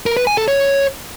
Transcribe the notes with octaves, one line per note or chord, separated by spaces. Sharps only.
A#4
B4
G#5
A4
C#5